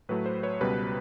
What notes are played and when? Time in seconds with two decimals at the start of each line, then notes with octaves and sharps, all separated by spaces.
0.09 A2 F#3 A3 B4
0.26 C5
0.43 B4 C#5
0.61 C#2 B2 G3 B4